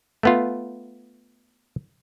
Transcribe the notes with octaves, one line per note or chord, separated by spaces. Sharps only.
A3 B3 F4